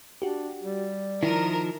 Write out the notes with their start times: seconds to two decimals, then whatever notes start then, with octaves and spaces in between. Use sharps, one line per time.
0.22 D4 F#4 G4
0.63 G3
1.23 D#3 F3 E4 A#4